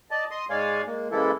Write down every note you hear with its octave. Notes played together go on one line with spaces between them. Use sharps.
D5 D#5 A5
D#5 C6 D#6
G#2 G#3 C#5 D5 F5 G#5
G#3 A#3
C#3 E3 G#3 A#3 E4 A4